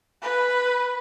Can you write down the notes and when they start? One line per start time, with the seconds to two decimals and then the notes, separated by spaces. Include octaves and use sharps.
0.22 B4